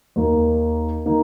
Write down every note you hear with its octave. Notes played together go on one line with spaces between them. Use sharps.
D#2 D#3 A#3 D#4
D#3 A#3 D#4